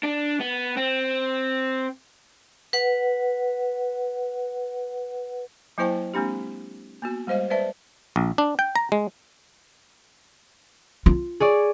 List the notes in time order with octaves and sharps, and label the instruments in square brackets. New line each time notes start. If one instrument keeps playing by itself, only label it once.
[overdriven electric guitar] D4
B3
C4
[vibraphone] B4 F#5
[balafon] F#3 A#3 E4 C5 G5 A5
G#3 A#3 C4 D4 G4
A#3 B3 F#4
G3 G#3 C5 D#5 F5
B4 C5 D5 E5 A5
[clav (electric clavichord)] A#1
D4
G5
A#5
G#3
[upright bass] F4
[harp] G#4 C#5 D5